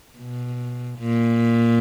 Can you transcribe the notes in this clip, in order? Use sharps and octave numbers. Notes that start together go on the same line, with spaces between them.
B2
A#2